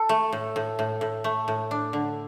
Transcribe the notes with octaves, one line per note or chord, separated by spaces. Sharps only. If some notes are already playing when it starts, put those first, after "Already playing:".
Already playing: A4
A3
A2
A2
A2
A2
A3
A2
D4
D3